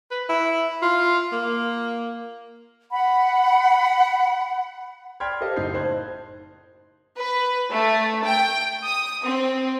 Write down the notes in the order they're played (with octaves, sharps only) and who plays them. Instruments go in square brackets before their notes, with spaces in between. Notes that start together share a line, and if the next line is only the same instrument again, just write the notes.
[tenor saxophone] B4
E4
F4
A#3
[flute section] F#5 B5
[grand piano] D5 G5 B5 C6 F6 G#6
G4 A4 A#4 C5 D#5 F5
F#1 A2 D#4 G6 C7
C5 D#5 A5 C6 F#6 G#6
[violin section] B4
A3
G5
D#6
C4